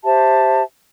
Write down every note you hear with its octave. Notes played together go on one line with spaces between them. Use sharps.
G4 C5 E5 A5